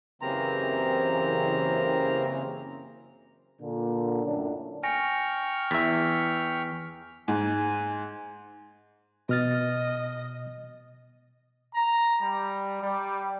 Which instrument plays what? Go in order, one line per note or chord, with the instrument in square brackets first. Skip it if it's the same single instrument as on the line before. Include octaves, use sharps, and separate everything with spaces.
[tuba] F#1 [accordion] C#3 E3 C4 [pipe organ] G4 A#4 C5 [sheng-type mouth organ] A#5
[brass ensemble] A#2 D3
F#2 A2 D4
[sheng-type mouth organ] G5 C#6 F6 [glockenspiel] G#5 A#6 C#7
[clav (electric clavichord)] E2 E5 [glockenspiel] B6
[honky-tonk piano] G#2 [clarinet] G#5
[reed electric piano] B2 F6 A6 [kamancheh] D#5
[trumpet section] A#5
G3
G3